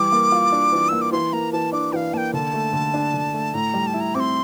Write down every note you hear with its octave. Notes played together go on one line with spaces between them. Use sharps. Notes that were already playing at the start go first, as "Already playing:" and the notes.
Already playing: E3 G3 D6
A#3
F4
D4
E3
A#3 E6
D6
E3 C6
A#3 A#5
E3 A5
D4 D6
E3 F5 G5
A#3 G5 A5
D3 A5
A3
D3
D4
D3
A3
A2 A#5
G3
A5
E4
A#5
C4 C6 D6